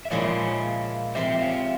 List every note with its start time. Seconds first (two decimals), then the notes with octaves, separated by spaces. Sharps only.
0.05 E5
0.11 A#2 F3 G#3 E4 C#5 F5
1.15 C3 F3 C4 C5 E5
1.41 C#5 F5